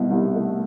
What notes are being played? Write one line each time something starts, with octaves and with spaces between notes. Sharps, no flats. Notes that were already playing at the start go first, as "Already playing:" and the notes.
Already playing: C2 B2
C2
A3